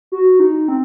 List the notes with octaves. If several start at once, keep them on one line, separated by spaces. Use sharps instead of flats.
F#4
D#4
C4